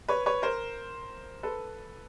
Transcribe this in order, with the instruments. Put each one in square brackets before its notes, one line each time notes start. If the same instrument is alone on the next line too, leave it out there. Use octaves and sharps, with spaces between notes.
[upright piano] B4 C#5
B4 C#5
A#4 C5
A4 B4